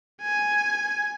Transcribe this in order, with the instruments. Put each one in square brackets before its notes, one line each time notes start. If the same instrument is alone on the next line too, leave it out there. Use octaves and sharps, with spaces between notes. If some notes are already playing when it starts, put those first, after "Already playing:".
[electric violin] G#5